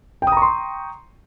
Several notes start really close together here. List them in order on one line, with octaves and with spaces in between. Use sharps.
G5 D#6 A#5 C#6 C6